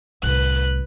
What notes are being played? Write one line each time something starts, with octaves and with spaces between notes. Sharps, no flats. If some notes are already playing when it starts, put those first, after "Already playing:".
C2 A2 B4 F#6